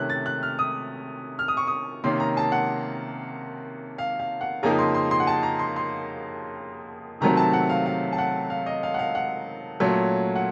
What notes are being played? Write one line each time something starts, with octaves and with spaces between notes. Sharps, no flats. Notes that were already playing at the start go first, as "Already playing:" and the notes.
Already playing: C3 D#3 A3 C#4 F#6
A6
F#6
F6
D#6
F6
D#6
C#6
D#6
C3 D#3 A#3 C#4 C6
A#5
A5
F#5
F5
F5
F#5
F2 C#3 F3 A#3 D#4 A#5
C6
C6
C6
F#5
A5
A#5
C6
C6
C3 D#3 F#3 A3 C4 A#5
A5
F#5
F5
F5
A5
F#5
F5
D#5
F5
F#5
F5
F#5
A#2 F#3 A3 C#4
F#5